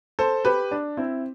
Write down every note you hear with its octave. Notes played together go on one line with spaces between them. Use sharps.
A4 C5
G4 B4
D4
C4 E4